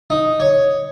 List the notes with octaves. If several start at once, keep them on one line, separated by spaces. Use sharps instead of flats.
D#4
C#5